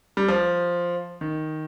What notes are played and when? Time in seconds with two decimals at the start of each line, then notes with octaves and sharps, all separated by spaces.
0.17 G3
0.28 F3
1.21 D#3